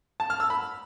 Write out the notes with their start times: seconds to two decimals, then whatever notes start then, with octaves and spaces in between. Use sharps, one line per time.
0.20 A5
0.30 F6
0.40 E6
0.50 B5